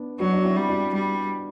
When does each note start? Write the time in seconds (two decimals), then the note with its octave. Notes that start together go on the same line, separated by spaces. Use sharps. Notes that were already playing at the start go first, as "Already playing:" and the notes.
Already playing: B3 D4
0.20 F#3 D4 F#4
0.33 D4
0.44 C4 E4
0.56 G3
0.69 D4 F#4
0.94 G3